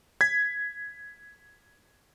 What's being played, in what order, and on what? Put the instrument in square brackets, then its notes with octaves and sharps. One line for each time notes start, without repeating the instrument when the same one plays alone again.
[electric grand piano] G#6 B6